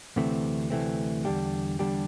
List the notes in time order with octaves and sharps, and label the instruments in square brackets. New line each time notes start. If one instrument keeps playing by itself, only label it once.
[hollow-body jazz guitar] D2 C3 E3 A3 C4
D2 C3 E3 A3 C4
E2 D3 G3 D4 G4
E2 D3 G3 D4 G4